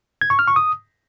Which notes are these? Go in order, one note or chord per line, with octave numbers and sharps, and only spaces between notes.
G#6
C#6
F6
C#6
D#6